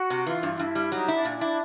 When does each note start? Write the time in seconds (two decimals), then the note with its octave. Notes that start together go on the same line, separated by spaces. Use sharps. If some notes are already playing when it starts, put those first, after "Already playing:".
Already playing: F#4
0.10 C3
0.26 E3 F4
0.43 G2
0.53 F4
0.59 G2 E4
0.75 G3
0.92 F#3 D#4
1.08 E4
1.14 D4
1.25 A#2
1.36 D4
1.41 E4